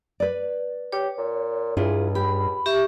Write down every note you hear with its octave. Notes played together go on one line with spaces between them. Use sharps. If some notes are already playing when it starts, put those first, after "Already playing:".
B4 D5
G4 C#5
A#2
C#2 G2 E4 F4 G#4
G4 B5
G4 E5 C#6